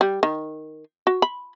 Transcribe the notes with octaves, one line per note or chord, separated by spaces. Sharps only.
G3
D#3
F#4
B5